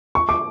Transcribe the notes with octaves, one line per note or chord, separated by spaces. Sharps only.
C#6
D6